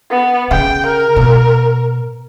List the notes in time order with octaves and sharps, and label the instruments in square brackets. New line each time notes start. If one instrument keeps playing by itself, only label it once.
[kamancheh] B3
[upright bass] C#3 [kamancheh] G5
[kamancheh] A#4
[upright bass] B2